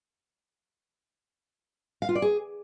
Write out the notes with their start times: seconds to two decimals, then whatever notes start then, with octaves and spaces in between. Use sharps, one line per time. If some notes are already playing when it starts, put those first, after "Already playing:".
2.02 F5
2.09 F4
2.15 D5
2.22 G#4